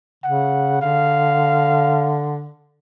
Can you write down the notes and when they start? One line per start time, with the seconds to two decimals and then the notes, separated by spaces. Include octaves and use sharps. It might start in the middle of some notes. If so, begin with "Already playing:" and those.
0.24 C#3 F#5
0.82 D3 F5